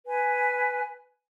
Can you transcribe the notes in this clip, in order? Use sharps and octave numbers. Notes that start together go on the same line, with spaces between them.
B4 G#5